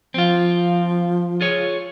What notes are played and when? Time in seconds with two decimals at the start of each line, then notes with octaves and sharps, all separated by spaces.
0.14 F3 C4 F4
1.41 F4 G#4 C#5